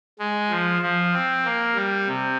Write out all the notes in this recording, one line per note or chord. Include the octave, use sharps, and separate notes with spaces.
G#3
F3
F3
C4
A#3
G3
C3